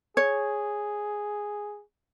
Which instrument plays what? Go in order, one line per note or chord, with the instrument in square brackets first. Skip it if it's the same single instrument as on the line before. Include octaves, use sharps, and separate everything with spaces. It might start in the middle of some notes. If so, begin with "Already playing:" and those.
[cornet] G#4 [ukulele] C#5